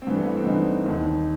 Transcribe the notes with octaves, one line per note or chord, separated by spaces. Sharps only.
C4
G2 E3 B3
G3
A3
B3
C4
G2 E3 D#4
D#2 D#3